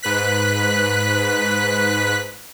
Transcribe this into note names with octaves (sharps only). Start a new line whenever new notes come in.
G#2 B4 F#6 B6